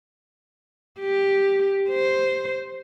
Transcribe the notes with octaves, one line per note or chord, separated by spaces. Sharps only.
G4
C5